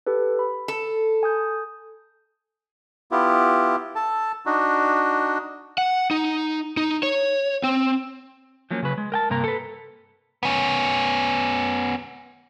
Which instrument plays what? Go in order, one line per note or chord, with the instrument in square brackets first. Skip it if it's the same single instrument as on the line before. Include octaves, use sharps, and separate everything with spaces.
[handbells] G4 A4 B4
B5
[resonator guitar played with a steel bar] A4
[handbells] G#5 D#6 G6
[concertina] B3 E4 F4 G4
A4 A5
D4 D#4 F#4
[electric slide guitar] F#5
D#4
D#4
C#5
C4
F3 F#3 A#3 C#4
C#3 F#3 B4
G#3
A#4 G5 A5
G2 C3 A#3 A#4 A#5
A4 B4
[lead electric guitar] B3 C#4